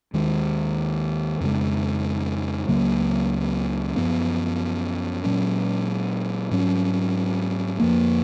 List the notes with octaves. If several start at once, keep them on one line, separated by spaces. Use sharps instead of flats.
D#2 D#3 G#3
F2 C#3 G#3
C#2 C#3 F#3 A#3
F#2 F3 B3
A#2 F#3 C#4
G#2 F#3 C#4
F2 F3 A#3